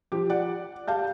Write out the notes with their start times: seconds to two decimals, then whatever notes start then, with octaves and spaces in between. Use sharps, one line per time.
0.12 F3 G4
0.30 D5 F#5
0.87 G4 F5 A5 G6